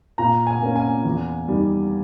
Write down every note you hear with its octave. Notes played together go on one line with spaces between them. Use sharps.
A#2 A#5
G#5
A#3 C#4
G#5
E2
D#3 G3